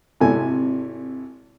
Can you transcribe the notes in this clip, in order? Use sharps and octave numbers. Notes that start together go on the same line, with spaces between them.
G#1 C3 E4 A4 G#5